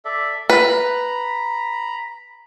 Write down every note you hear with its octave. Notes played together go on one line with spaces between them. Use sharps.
A4 D5 E5
B4 A#5 B5